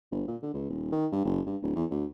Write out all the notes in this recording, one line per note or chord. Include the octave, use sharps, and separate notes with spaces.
G1
A#2
D3
C#2
D#1
D#3
G2
F#1
G2
D1
E2
D2